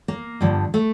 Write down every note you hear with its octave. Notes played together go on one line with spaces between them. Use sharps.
A#3
G2 D3 F3
A3